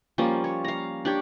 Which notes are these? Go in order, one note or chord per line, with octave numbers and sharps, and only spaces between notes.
F3 G3 A#3 C#4
C#5
F5 A#5
D4 G4 C#5